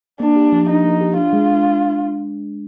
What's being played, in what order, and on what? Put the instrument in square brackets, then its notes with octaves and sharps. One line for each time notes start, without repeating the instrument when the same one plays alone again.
[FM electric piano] A#3 [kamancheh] D4
[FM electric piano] G4
F3
[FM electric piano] D4 [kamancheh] D#4
[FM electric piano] A#3
G4
[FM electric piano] D4 [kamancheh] F4
[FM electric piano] G#3